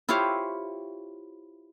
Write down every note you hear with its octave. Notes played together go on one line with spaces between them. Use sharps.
E4 F4 G4 C5 C#5 F5